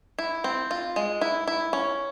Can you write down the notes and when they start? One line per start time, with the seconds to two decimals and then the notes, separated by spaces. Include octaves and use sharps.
0.18 E4
0.44 C4
0.71 F4
0.96 G#3
1.21 E4
1.47 E4
1.73 C#4